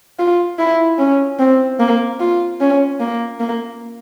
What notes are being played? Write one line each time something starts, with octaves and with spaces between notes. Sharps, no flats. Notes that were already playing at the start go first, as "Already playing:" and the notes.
F4
E4
C#4
C4
A#3
F4
C#4
A#3
A#3